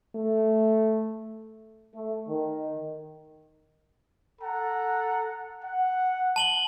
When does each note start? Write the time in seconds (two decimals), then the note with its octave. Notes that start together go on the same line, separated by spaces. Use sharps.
0.15 A3
1.95 A3
2.28 D#3
4.41 A4 F#5 A#5
5.62 F#5
6.36 A5 F#7 G7